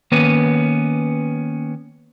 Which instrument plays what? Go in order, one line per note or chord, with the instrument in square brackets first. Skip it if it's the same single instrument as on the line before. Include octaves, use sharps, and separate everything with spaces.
[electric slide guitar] D#3 A#3 B3 C#4 B4